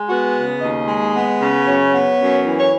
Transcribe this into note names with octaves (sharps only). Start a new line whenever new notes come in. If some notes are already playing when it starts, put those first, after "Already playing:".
Already playing: G#3
B3 F#4
C#3
D#2 D#5
G#3
B3
C#3
F#2 C#5
B3
F#2
E3
C#5